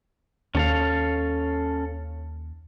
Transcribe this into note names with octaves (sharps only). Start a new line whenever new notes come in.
D#2 C#4 A4 F5